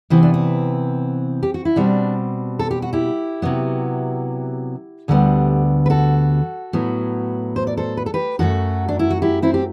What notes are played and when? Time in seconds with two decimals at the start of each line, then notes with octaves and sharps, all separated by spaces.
0.10 C3 E3 B3 C4
0.23 D4
0.34 C4
1.43 G4
1.54 F#4
1.65 E4
1.76 B2 G3 C4 D4
2.59 A4
2.71 G4
2.82 F#4
2.93 E4 G4
3.42 C3 F#3 B3
5.08 D2 D3 G3 B3
5.86 B4
5.90 F#4 A4
6.73 A2 F#3 B3
7.56 C5
7.67 D5
7.77 A4 C5
7.97 B4
8.06 A4
8.14 G4 B4
8.39 F#2 F#3 A3 F#4 A4
8.88 D4
8.99 E4
9.10 F#4
9.22 E4 G4
9.42 C4 E4
9.54 G4